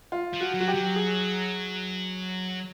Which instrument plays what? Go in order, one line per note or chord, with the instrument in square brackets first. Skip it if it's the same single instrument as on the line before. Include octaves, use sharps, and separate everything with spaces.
[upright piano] F4
[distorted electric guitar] F3
[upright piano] F#4
[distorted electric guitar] F#3
[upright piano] F#4
G4
[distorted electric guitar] F#3
[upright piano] G#4